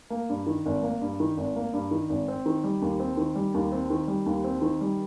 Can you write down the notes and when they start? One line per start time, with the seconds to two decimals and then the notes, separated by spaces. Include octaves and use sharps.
0.10 A#3
0.29 G2
0.46 D#3
0.66 G#1
0.83 A#3
1.01 G2
1.20 D#3
1.37 G#1
1.56 A#3
1.73 G2
1.91 D#3
2.09 G#1
2.28 C4
2.46 D#3
2.64 G3
2.82 D#2
3.00 C4
3.17 D#3
3.35 G3
3.54 D#2
3.72 C4
3.90 D#3
4.08 G3
4.26 D#2
4.44 C4
4.62 D#3
4.81 G3